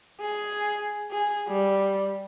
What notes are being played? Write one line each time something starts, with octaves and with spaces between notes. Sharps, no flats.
G#4
G#4
G3